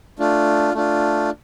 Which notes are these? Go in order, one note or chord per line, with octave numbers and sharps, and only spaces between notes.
A3 D4 F4
A3 D4 F4